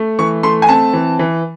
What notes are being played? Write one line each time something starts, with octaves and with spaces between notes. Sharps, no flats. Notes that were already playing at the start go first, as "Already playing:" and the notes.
Already playing: A3
E3 C#6
A3 C6
G#5
C4 A5
E3
E3